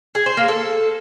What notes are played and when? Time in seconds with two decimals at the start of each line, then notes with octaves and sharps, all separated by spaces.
0.15 G#4
0.26 C5
0.37 A#3
0.48 A4